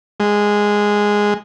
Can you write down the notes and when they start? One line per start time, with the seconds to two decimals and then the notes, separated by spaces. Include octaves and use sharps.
0.20 G#3